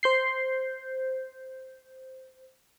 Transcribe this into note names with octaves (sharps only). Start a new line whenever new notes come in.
C5 G6 C7